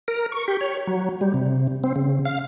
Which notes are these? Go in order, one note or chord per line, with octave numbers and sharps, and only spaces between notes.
A#4
C#6
G4
C#5
F#3
G3
C3
C4
C#3
F5